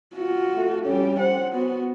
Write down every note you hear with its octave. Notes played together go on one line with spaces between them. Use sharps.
F4 F#4
A3
F2 G3 C#4 G4 C#5
C5 F#5
B3 F#4